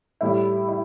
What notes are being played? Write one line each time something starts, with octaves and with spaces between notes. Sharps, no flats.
A2 G3 E4
E4